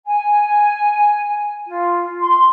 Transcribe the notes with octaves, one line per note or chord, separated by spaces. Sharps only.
G#5
F4
C6